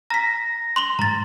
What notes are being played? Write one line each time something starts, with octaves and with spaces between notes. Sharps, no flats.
A#5 A#6 B6
C6 F7 G7
G#2 A#5 A6